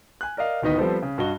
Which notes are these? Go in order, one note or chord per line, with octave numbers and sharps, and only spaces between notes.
G#5 F#6
A#4 D5 D#5 F5
D1 D#3 B3 D#4 D#5 B6
F3 G3 B3 C4 A4 C5
C#3
G2 F#4 D#5 G7